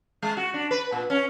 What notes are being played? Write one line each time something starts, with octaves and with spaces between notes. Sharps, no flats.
G#3
F#4
D4
B4
A#2
C#4